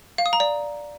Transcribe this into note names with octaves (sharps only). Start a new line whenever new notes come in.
F5
D#6
A#5
D5